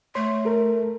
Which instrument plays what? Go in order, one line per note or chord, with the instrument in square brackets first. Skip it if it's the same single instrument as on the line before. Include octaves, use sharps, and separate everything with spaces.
[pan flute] A3 [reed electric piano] C#5 C6
[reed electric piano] A4 A#4